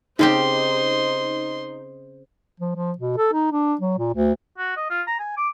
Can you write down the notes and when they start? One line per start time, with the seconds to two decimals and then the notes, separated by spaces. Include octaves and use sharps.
0.19 C#3 C4 D#4 G4 C5 D#5 C6
2.60 F3
2.75 F3
2.98 B2
3.17 A4
3.33 D#4
3.52 D4
3.81 F#3
3.98 A#2
4.14 D2
4.58 F#4
4.77 D#5
4.90 F4
5.07 A#5
5.19 G#5
5.37 D6